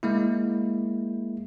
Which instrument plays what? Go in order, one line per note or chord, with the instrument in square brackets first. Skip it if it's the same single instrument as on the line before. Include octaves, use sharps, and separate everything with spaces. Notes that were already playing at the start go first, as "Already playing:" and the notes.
[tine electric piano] G#3 A#3 E4